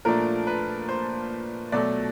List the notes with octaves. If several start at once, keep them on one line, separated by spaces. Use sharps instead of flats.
A#2 F3 A3 D4 A#4
B4
C5
B2 F#3 A3 D5